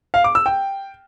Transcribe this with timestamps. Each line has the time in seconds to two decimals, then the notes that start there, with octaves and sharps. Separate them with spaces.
0.14 F5
0.24 D6
0.35 E6
0.46 G5